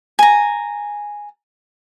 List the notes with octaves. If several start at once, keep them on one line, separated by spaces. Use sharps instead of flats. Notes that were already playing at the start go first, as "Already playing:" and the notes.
G#5 A#5